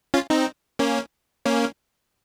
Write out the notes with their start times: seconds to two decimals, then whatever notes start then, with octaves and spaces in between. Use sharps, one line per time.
0.14 C#4 F4
0.30 C4 D#4
0.79 A#3 C#4
1.45 A#3 C#4